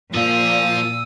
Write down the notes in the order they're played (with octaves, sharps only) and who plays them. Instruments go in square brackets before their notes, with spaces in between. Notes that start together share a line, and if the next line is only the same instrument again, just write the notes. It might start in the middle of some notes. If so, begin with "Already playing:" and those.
[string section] A#2 [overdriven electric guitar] F3 F4 [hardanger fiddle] D#6 [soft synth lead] E6